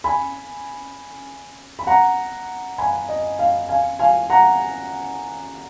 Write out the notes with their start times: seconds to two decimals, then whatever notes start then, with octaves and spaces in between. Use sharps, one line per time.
0.04 G#5 B5
1.79 B5
1.87 F#5 A#5
2.78 G#5 B5
3.09 D#5
3.39 F5
3.69 F5 G#5
3.99 F5 G#5
4.30 F#5 A#5